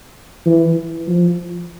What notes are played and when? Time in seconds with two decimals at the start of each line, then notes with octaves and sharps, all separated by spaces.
0.46 E3
1.07 F3